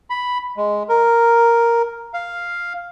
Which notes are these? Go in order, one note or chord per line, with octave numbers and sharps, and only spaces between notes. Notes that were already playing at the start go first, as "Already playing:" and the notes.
B5
G#3
A#4
F5